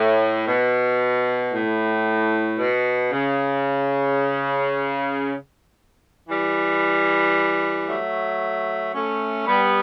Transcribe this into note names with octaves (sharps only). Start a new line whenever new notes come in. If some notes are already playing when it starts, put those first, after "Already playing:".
Already playing: A2
B2
A2
B2
C#3
E3 G3
F#3 A3
A3 C#4
G3 B3